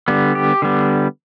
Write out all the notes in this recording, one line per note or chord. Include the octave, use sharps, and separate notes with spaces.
D3 G3 B3
G4
D3 G3 B3